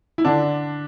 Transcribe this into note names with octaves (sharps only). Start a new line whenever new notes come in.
E4
D3 D4